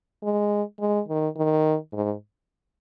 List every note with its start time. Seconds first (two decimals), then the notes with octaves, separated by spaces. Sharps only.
0.23 G#3
0.80 G#3
1.08 D#3
1.36 D#3
1.93 G#2